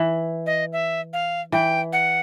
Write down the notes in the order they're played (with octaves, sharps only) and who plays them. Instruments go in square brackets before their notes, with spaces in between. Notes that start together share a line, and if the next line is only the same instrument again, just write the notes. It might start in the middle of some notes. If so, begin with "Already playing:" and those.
Already playing: [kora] E3
[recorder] D#5
E5
F5
[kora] E3 [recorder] G5
[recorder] F#5